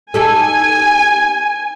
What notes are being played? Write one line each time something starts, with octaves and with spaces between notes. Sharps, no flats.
D#4 G4 A4 G#5